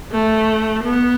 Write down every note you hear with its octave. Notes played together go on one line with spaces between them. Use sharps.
A3
B3